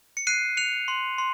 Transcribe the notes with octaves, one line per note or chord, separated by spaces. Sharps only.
C#7
F#6 C7 D#7
F#6 C#7 F7
C6
C6